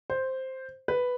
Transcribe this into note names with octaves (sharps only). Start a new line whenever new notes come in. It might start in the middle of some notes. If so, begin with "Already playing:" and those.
C5
B4